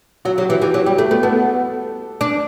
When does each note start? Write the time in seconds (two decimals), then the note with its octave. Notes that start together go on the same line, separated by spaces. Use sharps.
0.25 F#3 F#4
0.38 F#3 G4
0.49 E3 G4
0.62 E3 G4
0.74 F#3 G4
0.86 G3 G4
0.98 A3
1.11 A3 B3
1.23 B3 A4
2.21 D4